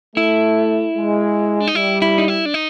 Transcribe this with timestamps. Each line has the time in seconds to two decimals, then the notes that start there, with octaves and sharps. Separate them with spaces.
0.16 A3 E4
0.96 G#3
1.60 D4
1.68 D#4
1.75 G3 E4
2.02 E4
2.18 D#4
2.28 E4
2.46 D4
2.54 D#4